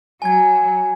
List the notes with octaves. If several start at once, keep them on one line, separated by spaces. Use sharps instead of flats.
F#3 G#5 G#6